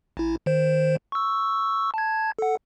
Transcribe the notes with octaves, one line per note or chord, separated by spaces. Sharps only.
A1 E4
D#3 C5
C#6 E6
A5 G#6
A4 F#5